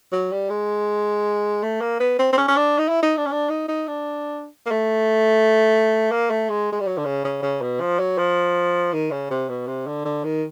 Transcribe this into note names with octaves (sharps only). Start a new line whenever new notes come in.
F#3
G3
G#3
A3
A#3
B3
C4
C4
C#4
C#4
D4
D#4
E4
D#4
D4
C#4
D4
D#4
D#4
D4
A#3
A3
A#3
A3
G#3
G#3
G3
F#3
D3
C#3
C#3
C#3
B2
F3
F#3
F3
D#3
C#3
C3
B2
C3
D3
D3
D#3